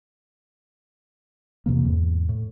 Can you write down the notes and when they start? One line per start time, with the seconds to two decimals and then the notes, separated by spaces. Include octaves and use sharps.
1.66 F2 C3 E3 A#3
1.85 E2 G#2
2.29 A2